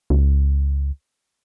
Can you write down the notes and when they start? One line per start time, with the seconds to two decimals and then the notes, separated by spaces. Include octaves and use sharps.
0.10 C#2